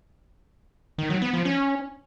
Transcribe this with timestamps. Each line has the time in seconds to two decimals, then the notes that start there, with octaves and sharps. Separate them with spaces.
0.98 D#3
1.10 F#3
1.22 B3
1.34 F3
1.45 C#4